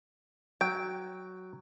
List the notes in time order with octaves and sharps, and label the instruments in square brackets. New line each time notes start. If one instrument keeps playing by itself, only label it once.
[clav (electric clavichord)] F#3 [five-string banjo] G5